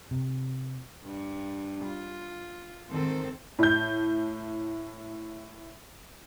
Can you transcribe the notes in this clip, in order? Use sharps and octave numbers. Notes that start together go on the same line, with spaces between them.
C3
G2
F4
G#2 D#3 C4 A4 C5
A2 G6